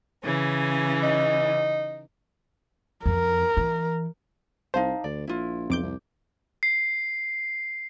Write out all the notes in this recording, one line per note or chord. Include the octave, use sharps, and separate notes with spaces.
C#3 E3 C#4
D#4
F2 A#4
E3
C2 D#4 C5 F5 A5
D2 D5
A#1 E4 F4
B1 F2 D6 G6
C2
C7